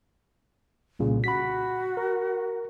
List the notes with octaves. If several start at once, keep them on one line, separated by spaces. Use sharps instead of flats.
C2 A#2 C#3
F#4 B5 B6
A#4